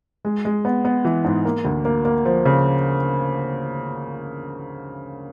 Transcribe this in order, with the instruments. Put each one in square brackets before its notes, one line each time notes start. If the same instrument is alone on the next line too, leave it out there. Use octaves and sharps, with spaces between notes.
[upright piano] G#3
G#3
B3
B3
E3
G#2
A#3
D2
A#3
A#3
F3
C#3